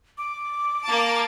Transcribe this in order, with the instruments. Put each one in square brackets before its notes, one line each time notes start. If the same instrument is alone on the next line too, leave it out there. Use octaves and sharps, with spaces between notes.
[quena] D6
[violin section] A#3 A5 D7